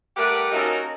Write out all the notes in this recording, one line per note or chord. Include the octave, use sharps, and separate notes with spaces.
G3 A3 G4 A#4 B4 F#5
A#3 C#4 D#4 F#4 A4 A#4